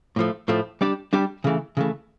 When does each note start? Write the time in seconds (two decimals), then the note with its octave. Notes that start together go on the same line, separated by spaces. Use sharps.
0.16 A2 F3 A3
0.48 A2 F3 A3
0.81 G3 D4 G4 D5
1.13 G3 D4 G4 D5
1.44 C#3 E3 A3
1.77 C#3 E3 A3